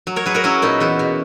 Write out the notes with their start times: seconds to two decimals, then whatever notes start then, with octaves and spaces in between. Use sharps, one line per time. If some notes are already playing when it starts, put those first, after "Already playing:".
0.07 F#3
0.16 A#4 C#5
0.26 F#3 G#4 B4
0.34 F#4 A#4
0.44 F#3 C#4 E4
0.62 A#2 B3 D#4
0.80 E2 B3
0.99 B2